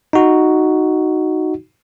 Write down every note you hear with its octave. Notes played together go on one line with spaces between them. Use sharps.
D#4 F#4